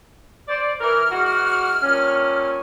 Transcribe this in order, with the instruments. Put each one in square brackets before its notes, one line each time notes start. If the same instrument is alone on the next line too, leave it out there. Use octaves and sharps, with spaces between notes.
[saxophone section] C5 D5
[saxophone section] E3 A#4 [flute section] F6
[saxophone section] E3 G#3 F#4
G2 A#2 C#4